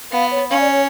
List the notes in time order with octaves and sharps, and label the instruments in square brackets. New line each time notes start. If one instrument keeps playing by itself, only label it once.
[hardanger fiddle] B3 [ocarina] F5
[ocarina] C#5
[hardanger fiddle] C#4 [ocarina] F5
[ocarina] D5
C#5